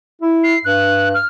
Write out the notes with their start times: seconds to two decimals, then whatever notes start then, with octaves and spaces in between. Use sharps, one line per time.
0.22 E4
0.44 C7
0.65 G2 F#6
1.14 F6